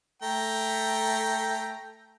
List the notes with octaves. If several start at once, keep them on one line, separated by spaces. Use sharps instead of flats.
A3 G5 A#5